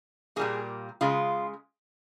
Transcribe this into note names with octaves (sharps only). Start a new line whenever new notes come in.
A#2 G3 A#3 G#4
C#3 G#3 F4